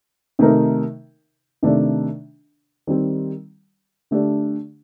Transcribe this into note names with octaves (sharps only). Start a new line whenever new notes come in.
C3 D#3 A3 D#4 A#4
C3 D#3 A3 D4
D#3 G3 C4
D3 A3 D4 G4